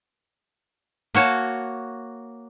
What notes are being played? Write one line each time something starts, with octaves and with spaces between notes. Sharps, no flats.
A#3 F#4 C#5 A5